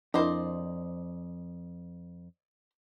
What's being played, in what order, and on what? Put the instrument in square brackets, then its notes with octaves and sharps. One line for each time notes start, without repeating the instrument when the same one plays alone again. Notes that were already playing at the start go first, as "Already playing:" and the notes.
[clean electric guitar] F2 [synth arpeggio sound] D4 E4 A#4 [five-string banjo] C5 D5 D#5